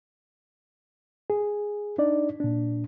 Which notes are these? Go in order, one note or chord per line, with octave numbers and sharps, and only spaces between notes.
G#4
D4 D#4 D5
A#2 D4